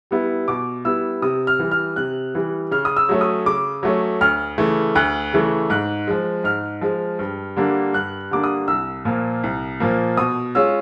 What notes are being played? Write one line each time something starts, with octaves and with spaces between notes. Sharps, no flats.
G3 B3 E4
B2 D6
G3 B3 E4 E6
C3 D#6
F6
E3 G3
F6
C3 F#6
E3 G3
C#3 F6
D#6
E6
F#3 A3 C#4
D#6
C#3 D6
F#3 A3 C#4
D2 F6
C#3 E3 A3
D2 F#6
C#3 E3 A3
G#2 F#6
F3 G#3
G#2 F6
F3 G#3
G2
D3 G3 A#3 D4
G2 F#6
D3 G3 A#3 D4 D6
D#6
C2 E6
A#2 F3 A#3
C2
A#2 F3 A#3
B2 D#6
G#3 C#4 F4 E6